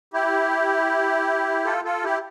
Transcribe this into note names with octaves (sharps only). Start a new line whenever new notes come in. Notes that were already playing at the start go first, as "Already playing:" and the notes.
E4 G4
F4 A4
F4 A4
E4 G4